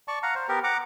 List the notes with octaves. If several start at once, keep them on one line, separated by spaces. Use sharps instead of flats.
D5 A5 C#6
F5 F#5 A#5
C5
B3 G4 A#4
F#5 A#5 D6